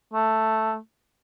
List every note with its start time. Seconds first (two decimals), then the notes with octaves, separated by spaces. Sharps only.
0.13 A3